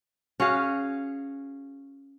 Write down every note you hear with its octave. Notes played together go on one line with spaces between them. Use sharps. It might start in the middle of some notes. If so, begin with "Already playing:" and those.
C#4 F#4 G#4 F5